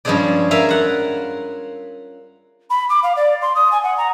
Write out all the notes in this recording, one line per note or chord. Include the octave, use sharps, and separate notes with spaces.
G2 F3 G#3 C#4 G#4 D5
A#4 E5 F5 G#5
F4 F#5
B5
D6
F5
D5
C6
D#6
G#5
F#5
A#5